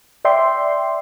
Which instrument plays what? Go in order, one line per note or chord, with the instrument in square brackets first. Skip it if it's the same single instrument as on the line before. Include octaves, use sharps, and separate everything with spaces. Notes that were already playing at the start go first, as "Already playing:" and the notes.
[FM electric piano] D5 E5 G5 C6